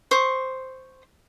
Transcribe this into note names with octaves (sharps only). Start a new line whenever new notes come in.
C5 C#6 D#6